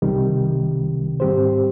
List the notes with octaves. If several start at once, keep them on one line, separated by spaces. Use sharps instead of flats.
C2 C3 D#3 G3
G#2 G3 C4 G4 C5